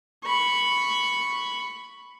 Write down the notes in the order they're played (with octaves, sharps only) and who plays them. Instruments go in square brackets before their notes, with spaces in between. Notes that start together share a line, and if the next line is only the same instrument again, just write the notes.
[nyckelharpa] B5 C#6